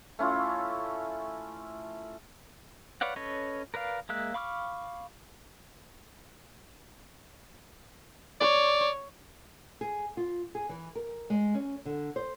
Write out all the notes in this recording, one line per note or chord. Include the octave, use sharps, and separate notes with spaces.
A3 C#4 E4 F4
B4 C#5 D5 F5 F#5
C#4 A4 B4 C#5 D#5
A#4 B4 D5 F5
G#3 A#3 E5 F#6
F5 B5 C#6 D6 F6
C#5 D5
G#4
F4
G#4
E3
A#4
G#3
C#4
D3
C5